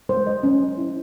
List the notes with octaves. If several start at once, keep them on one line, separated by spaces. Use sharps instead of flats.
G#3 C5
D#5
C#4
E4